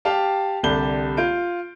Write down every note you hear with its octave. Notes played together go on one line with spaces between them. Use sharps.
G4 F5 G5 A5
C2 D3 G4 A5 G6 G7
F4 G6 D7